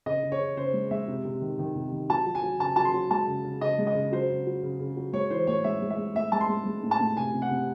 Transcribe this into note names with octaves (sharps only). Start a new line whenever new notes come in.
C#3 D#5
C#3
C#5
C#3
C#3 C5
G#3
G#3 E5
C3
C3
D#3
D#3
C3
D#3
F#3 A5
F#3
G#5
F#3
C#3 A5
F#3 A5
C6
F#3
G#3 A5
C#3
C#3
C#3 D#5
G#3
D#5
C#3
F#3 C5
C#3
F#3
C#3
C#3
F#3
G#3 C#5
E3 C5
A2 C#5
G#3 E5
G#3
E5
G#3
A2 E5
G#3 A5
C6
G#3
G#3
A2
A5
A2
C3 G#5
C3
F#5
C3